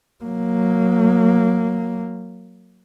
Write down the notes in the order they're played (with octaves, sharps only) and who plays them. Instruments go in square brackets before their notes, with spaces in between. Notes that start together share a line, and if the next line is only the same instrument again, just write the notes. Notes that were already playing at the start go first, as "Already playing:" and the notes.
[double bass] F#3 A#3